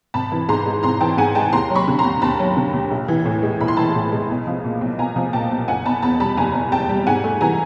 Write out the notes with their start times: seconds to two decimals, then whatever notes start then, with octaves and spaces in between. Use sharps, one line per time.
0.14 G#1 A5 B5
0.32 E3
0.49 G#2 A#5 C6
0.66 G#3
0.83 G#1 A#5 C6
1.01 E3 G5 A5
1.18 G#2 F#5 G#5
1.35 G#3 G5 A5
1.53 D#2 A#5 C6
1.70 F#3
1.75 B5 C#6
1.88 D3
1.99 A#5 C6
2.04 D#2
2.22 D#2 A5 B5
2.39 F#3
2.57 D3
2.73 D#2
2.91 A#1
3.08 E3
3.25 A2
3.43 G#3
3.60 A#1 B5
3.68 C6
3.76 E3 A5 B5
3.95 A2
4.12 G#3
4.30 B1
4.47 F3
4.64 A#2
4.81 B1
4.98 B1 G#5 A#5
5.16 F3
5.33 A#2 G5 A5
5.51 B1
5.68 F#1 F#5 G#5
5.85 B2 A5 B5
6.02 E2 A5 B5
6.20 G3 A5 B5
6.37 F#1 G#5 A#5
6.54 B2
6.72 E2 G5 A5
6.89 G3
7.07 G#2 F#5 G#5
7.24 A3
7.41 E3 G#5 A#5